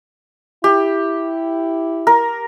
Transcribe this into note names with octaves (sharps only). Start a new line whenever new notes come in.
E4 G4
A#4